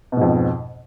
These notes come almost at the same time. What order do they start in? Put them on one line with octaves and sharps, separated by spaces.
B2 G#2 F2